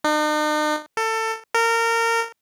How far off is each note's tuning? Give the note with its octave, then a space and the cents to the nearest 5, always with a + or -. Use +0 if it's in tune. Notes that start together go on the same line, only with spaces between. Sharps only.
D#4 -45
A4 +25
A#4 -25